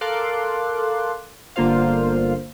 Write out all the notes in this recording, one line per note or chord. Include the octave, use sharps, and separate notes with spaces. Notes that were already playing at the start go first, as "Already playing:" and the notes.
A4 A#4 F5 C6 D6 F#6
G1 D3 A#3 F4 C5 F5